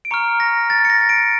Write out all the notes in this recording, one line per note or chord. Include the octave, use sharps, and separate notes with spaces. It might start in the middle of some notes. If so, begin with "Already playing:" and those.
D7
A#5 C#6 F6 C#7
A#6
A6
C#7
A#6
D7